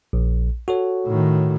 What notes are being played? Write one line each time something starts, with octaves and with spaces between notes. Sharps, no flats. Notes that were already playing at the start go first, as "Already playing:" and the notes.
A#1
F#4 A4 C#5
A2 D#3